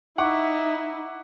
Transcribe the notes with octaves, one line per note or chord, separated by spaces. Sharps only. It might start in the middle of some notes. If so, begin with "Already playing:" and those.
D#4 E4 E5 F#5 C#6 D6